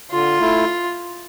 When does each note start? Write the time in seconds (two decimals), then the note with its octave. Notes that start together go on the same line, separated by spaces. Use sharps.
0.11 D3 F4
0.38 A3 E4